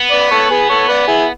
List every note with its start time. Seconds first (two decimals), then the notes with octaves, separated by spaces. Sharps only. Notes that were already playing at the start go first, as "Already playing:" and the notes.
Already playing: B3
0.11 B4 D5
0.31 A4 C#5
0.50 G#4 B4
0.69 A4 C#5
0.88 B4 D5
1.07 E4 G#4